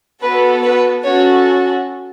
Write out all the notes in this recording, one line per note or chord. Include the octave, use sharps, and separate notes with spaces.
B3 F#4 A4 B4
B4
C#4 F#4 A4 C#5